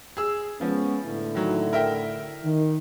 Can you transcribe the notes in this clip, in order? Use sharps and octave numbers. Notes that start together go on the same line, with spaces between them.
G#4 E6
F3 G#3 B3 C#4
A2 D3 E4
D#3 F#3
A#4 E5 G5
D#3